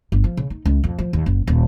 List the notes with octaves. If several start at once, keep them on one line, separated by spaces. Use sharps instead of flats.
G1
F3
C#3
D#4
C#2
F2
F3
D#2
F#1
D#1